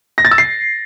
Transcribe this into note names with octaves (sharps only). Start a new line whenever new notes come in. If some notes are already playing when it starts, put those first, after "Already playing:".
A#6
A6
E6
C7